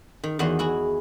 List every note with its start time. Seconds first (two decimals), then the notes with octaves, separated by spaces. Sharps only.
0.24 D#3
0.39 E2 D#3 F#4 D#5 C6
0.59 E4 F#4 G#4